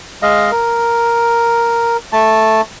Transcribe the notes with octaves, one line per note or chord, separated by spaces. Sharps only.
G#3 D#5 F5
A#4
A3 A5